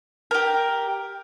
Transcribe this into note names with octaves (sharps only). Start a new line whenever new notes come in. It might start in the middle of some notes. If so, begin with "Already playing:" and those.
G4 A#4